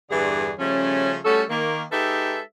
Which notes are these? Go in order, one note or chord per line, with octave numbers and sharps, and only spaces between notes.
E2 G2 D3 E3 G#4
C#3 F3 G3 A3 C#4
G3 A3 C#4 F#4 A4
D#3 A#3
G#3 D#4 G4 A4 B4 E5